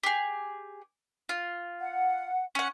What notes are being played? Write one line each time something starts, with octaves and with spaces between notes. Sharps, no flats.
G4 G#4
F4
F#5
C#4 F#5